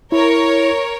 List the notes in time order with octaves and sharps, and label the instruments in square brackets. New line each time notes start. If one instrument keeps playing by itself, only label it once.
[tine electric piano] E4 [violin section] A#4 C#5